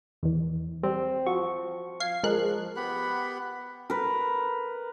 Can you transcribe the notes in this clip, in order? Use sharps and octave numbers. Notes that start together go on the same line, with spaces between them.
E2 E3
G3 C4
F3 F#4 C#6
F5 G#6 C7
F3 G#3 A#4 F#6
B3 G4 F#5 B5
A#4 B4